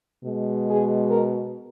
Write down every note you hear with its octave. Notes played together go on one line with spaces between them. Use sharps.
B2 G#3
G#4
A#4